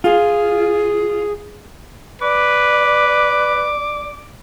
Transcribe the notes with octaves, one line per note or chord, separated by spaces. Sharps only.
F4 G#4
B4 D5 D6